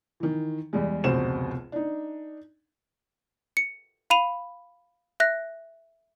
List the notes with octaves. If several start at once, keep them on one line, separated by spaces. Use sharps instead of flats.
D#3 E3
E2 G3 G#3
F1 C#2 B2 C4 C5 E7
D4 D#4
C#7
F5 B5 D#7 F7
E5 F#6 A#6